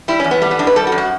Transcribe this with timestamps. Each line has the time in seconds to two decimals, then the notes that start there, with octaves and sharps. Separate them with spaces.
0.08 G3 E4
0.20 E2 C#4
0.31 B3
0.42 G3 A3
0.51 B3
0.59 F#2 D4
0.67 B4
0.76 G3 A4
0.87 F#4
0.92 F#2
0.98 F#4